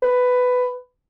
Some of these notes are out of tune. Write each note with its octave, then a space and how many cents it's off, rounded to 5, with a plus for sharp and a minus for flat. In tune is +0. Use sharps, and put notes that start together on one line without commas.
B4 +10